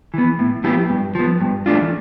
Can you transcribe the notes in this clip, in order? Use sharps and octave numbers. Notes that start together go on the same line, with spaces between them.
E3 B3
A2
F3 B3 E4 G4
G2
F3 B3
G2
E3 A3 D4 F4